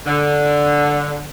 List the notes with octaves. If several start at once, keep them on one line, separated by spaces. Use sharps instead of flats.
D3